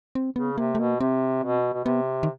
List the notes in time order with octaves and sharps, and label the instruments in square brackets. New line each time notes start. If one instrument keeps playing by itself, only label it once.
[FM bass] C4
[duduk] C#3 [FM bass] B3
[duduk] C3 [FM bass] A#3
[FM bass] A3
[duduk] B2 [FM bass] A#3
[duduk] C3 [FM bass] C4
[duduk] B2
B2
[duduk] C3 [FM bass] B3
[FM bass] D#3